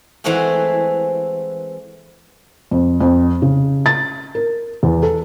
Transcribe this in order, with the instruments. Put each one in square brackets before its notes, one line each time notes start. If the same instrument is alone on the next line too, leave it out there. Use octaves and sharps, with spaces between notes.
[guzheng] E3 G#3 A3 C4 F#4 G#4
[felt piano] F2
F2
C#3
A6
A#4
E2
A4